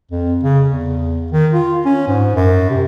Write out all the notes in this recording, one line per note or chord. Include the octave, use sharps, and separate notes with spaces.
F2
C#3
E2
D#3
F4
C#4
G#2
F#2
C3